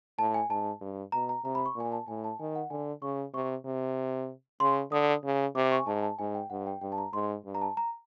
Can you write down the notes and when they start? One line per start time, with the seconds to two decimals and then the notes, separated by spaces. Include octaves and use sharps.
0.19 A2 A5
0.34 G#5
0.50 G#2 A5
0.81 G2
1.12 B2 A#5
1.29 A#5
1.44 C3 A#5
1.55 B5
1.66 C#6
1.76 A#2 G#5
1.92 A5
2.08 A2 G#5
2.24 A5
2.39 D#3 G#5
2.55 F#5
2.70 D3 G#5
3.02 C#3 C#6
3.34 C3 C#6
3.65 C3
4.60 C#3 C6
4.92 D3 D#6
5.24 C#3
5.55 C3 D6
5.72 C#6
5.79 G#5
5.87 G#2 A5
6.03 A5
6.19 G#2 G#5
6.35 G5
6.50 G2 F#5
6.67 G5
6.81 G2 G5
6.92 A5
6.98 A#5
7.13 G#2 C6
7.45 G2
7.55 A#5
7.62 A5
7.77 A#5